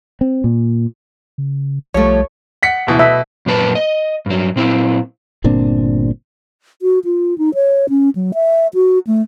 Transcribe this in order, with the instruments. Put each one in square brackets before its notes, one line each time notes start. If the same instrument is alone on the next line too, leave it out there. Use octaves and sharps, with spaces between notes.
[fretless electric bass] C4
A#2
[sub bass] C#3
[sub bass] B1 [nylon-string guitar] F3 G3 A3 [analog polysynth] C#5
[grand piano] F#5 B6 C#7
D1 B2 E3
[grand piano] B2 [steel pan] E5
[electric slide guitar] F#2 A#2 A#3 B4 A5
D#5
G2 F#3
A#2 C4 E4
[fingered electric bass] G1 A#2 C4 D4
[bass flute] F#4
F4
D#4
C#5
C#4
F#3
E5
F#4
A3